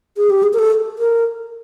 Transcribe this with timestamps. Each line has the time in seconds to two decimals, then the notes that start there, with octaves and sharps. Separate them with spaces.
0.17 G#4
0.30 G4
0.43 G#4
0.53 A#4
0.59 A4
0.99 A#4